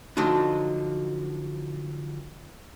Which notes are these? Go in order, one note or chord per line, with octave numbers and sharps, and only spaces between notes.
D3 F3 F#3 D4 D#4